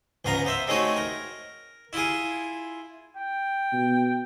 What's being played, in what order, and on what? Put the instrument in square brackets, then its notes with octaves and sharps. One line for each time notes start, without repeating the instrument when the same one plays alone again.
[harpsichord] C#2 G#2 B3 F5 A#5
B3 C5 E5
G#3 A3 C4 D#4 F#4 C#5
A#4
E4 F4 G#4
[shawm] G5
[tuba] B2